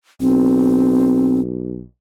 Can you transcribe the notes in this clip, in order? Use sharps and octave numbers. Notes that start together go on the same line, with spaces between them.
B1 C4